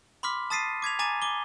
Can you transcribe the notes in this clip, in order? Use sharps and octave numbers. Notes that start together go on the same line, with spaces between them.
B5 C6 D6 F6 B6
A5 D#6 A6 B6 C7 D#7
D6 G#6 B6 F7
G#5 A#5 D6 A6 D#7
D6 G7